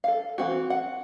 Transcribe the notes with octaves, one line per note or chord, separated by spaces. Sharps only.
A4 F5
E3 C4 F#4
F#5